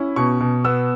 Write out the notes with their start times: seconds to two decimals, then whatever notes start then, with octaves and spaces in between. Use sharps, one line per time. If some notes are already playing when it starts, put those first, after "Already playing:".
Already playing: C#4 E4
0.16 B2 C#6
0.40 B2
0.65 B3 E6